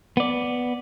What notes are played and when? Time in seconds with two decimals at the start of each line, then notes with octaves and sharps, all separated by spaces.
0.17 B3 D5